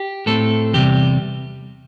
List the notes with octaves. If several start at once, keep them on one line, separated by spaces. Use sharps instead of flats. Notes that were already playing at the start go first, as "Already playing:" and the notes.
Already playing: G4
A2 A3 C4 A4
E2 C3 G3 G4